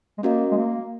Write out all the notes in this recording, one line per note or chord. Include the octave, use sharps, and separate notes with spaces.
G#3
A#3 C#4 F#4 A#4 D#5
G#3
A#3